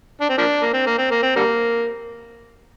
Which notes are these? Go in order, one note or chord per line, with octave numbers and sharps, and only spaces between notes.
D4
C4
F3 A#3 D4
A#3
C4
A#3
C4
A#3
C4
D3 G3 A#3